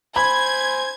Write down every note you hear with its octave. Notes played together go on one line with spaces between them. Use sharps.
C5 G#5 B5 G#6